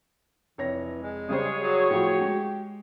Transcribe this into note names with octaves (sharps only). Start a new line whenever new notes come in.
F1 E3 C#5 A#6
G#3
C#3 G3 G#4 C5 C#5
F#3 F#4
A2 F3 G4
G#3